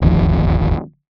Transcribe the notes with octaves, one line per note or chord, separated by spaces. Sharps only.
D1 G1 D#2 F3